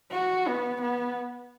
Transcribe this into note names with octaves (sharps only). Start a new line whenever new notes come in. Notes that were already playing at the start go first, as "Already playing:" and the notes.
F#4
B3
B3